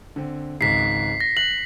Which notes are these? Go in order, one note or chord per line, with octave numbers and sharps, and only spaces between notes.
D3 C4
G#1 C#2 G#2 B6 C7
A#6
F#6 F#7